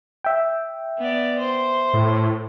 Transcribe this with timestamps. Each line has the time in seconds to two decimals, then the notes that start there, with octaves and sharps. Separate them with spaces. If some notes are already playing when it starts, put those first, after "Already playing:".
0.24 E5 G5
0.98 B3 D5
1.40 C5
1.94 A2